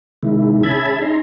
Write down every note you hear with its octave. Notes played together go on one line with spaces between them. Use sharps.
C3 D#3 G#3 E4
C#4 G#4 E5 A5 B5 G#6
D#4 A#5 C6